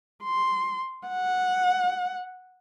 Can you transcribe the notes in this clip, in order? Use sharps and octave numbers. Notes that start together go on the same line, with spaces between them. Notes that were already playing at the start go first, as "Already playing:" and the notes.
C6
F#5